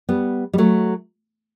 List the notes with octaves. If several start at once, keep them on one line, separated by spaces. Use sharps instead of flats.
G3 B3
G3
F#3 A3